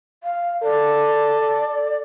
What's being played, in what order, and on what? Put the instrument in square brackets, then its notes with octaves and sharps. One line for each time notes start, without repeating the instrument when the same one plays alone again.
[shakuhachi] F5
[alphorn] A4 [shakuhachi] D5